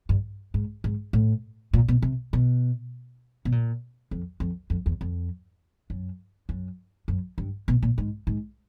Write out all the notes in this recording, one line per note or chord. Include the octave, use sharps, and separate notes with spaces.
G2
G#2
G#2
A2
A#2
B2
C3
B2
B2
A#2
F2
F2
F2
E2
F2
F#2
F#2
F#2
G2
B2
A#2
G#2
G#2